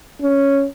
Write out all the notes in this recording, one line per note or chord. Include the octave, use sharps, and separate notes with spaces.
C#4